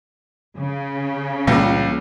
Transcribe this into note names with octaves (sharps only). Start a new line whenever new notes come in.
C#3
C#2 A#2 E3 G3 A#3